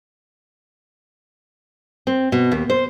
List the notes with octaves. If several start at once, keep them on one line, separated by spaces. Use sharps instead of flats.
C4
B2
D#2
C5